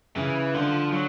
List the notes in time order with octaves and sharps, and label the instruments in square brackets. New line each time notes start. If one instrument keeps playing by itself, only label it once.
[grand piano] C#3 [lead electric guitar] E3
[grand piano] D3 [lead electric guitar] F3
[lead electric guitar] F#3